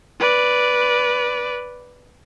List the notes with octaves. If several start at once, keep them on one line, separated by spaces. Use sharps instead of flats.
B4 D5